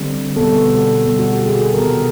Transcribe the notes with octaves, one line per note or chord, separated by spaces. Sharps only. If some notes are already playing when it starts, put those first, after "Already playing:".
Already playing: D3 G3 C4
B2 G3 B3 A4
B2 G3 B3
F#4
G4
G#4
A4
C3 D#3 G3 B3 A#4